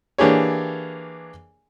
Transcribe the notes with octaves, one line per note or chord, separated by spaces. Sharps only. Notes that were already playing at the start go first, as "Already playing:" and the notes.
E3 A#3 D4 G4 G#4 C#5